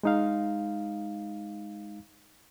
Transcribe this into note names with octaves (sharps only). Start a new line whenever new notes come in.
G#3 D#4 F5